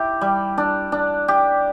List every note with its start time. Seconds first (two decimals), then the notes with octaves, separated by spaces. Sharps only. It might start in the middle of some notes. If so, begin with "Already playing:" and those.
Already playing: E4 G4
0.21 G3
0.58 D4
0.92 D4
1.28 G4